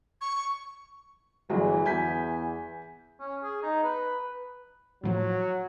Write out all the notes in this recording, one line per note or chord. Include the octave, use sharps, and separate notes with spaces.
C#6
G1 E3 F#3 G#4
E2 G#5 G6 B6
C#4
G#4
D#4
B4
A2 F3 F#3